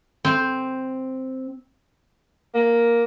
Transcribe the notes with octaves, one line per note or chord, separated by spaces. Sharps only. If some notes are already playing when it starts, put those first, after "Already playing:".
C4
A#3